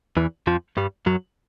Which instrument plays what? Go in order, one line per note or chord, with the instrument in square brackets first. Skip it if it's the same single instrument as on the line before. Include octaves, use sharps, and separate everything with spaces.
[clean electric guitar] E2 E3
F2 F3
G2 G3
F#2 F#3